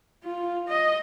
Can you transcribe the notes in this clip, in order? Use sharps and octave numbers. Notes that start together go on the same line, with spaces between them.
F4
D#5